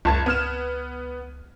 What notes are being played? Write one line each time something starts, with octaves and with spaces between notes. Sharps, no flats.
F#1 C#2 A5 G#6
B3 F6 E7